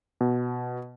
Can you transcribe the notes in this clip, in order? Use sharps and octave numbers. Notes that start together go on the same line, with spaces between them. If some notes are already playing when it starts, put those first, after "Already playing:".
B2